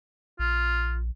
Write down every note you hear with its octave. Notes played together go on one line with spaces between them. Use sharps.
A#1 F4